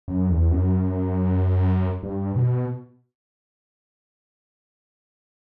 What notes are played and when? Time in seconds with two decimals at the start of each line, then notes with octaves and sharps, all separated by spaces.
0.08 F#2
0.30 E2
0.51 F#2
2.03 G2
2.36 B2